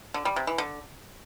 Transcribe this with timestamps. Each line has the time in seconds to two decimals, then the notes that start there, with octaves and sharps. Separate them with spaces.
0.14 D3
0.25 G3
0.36 C3
0.47 E3
0.58 D3